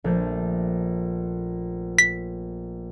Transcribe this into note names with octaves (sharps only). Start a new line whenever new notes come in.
A#1 A3 G6
B6